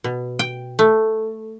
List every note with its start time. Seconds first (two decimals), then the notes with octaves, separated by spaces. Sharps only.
0.04 B2
0.39 G5
0.79 A3